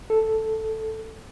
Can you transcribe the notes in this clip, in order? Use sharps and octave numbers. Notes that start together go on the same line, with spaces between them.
A4